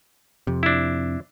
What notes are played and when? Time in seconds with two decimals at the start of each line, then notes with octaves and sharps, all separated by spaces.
0.47 F2 C3
0.63 D4 E4